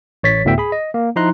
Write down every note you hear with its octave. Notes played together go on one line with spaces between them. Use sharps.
A1 C#5 A6 B6
D2 A2 A3 B3 E5 G5
G#4 B5
D#5
A#3
F3 D#4 E4 A#5 C6 F#6